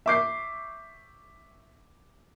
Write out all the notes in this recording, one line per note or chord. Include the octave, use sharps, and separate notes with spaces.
E5 C#6 D6 G6 C7